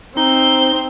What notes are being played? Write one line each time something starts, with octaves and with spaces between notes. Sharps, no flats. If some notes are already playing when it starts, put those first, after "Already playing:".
C4 D#4 G7